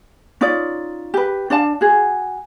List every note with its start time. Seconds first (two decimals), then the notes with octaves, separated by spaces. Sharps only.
0.41 C#4 D#4 F4 D5
1.14 G4 B4
1.50 D4 D5 F5 A5
1.81 F#4 G#4